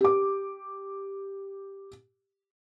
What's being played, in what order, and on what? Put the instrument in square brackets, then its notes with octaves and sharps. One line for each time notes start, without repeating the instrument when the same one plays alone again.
[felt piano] G4 D6